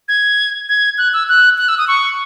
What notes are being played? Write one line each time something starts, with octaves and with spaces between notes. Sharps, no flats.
G#6
G#6
F#6
E6
F#6
F#6
E6
D#6
C#6